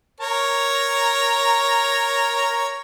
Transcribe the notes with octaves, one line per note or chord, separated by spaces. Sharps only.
A#4 C#5 A#5